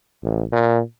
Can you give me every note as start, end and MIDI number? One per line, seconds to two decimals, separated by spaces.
0.24 0.43 33
0.52 0.80 46